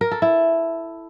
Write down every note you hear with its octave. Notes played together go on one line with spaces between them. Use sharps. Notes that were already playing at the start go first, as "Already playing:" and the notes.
A#4
A4
E4